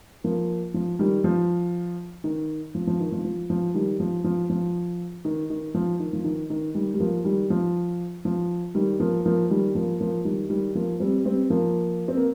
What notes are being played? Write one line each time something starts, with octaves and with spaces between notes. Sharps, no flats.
F3 A#3
F3
D#3 G3
F3
D#3
F3
F3
D#3
F3
F3
F3
D#3 G3
F3
F3
F3
D#3
D#3
F3
D#3
F3
D#3
D#3
D#3 G3
G3
F3 A#3
D#3 G3
F3
F3
D#3 G3
F3 A#3
F3 A#3
D#3 G3
F3 A#3
F3 A#3
D#3 G3
D#3 G3
F3 A#3
G3 C4
G3 C4
F3 A#3
C4
A#3